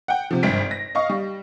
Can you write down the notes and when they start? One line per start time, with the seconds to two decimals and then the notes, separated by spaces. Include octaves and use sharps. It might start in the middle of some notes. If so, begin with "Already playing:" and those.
0.08 F#5 G5
0.31 C3 F3
0.43 G#1 G2 B6 D7
0.71 A#6
0.95 D#5 F5 C#6
1.09 G3